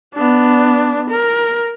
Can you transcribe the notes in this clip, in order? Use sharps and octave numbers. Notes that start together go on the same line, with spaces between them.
B3 D4
A#4